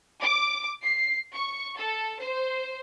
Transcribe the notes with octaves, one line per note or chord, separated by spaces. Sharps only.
D6
C7
C#6
A4
C5